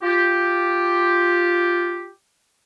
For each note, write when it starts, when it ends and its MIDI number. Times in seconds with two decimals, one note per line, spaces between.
0.03 2.09 65
0.03 2.09 67